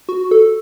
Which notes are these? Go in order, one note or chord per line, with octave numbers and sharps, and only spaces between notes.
F#4
A4